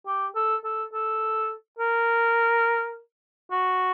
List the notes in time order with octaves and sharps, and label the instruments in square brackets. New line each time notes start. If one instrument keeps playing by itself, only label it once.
[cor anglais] G4
A4
A4
A4
A#4
F#4